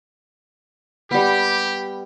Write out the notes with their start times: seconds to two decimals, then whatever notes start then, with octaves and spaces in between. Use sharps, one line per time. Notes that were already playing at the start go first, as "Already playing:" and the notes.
1.11 G3 B3 G4